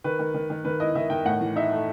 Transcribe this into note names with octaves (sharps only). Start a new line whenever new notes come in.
D#3 B4
D#3
D#3
D#3
D#3 B4
E4 D#5
D#3 E5
D#3 G5
A2 F#5
E3
D#4 E5
A3